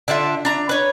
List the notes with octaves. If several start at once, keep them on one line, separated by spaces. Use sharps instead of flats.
D3 D4 F4 E5
D4 A#5
B4 C#5